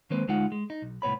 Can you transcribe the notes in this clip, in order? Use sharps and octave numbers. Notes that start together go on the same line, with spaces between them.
D#3 G#3 A#3 C4 B4 C5
D2 G#3 D#4 F4 F#5
G#3
D#4
B1
C2 A2 B3 C#5 B5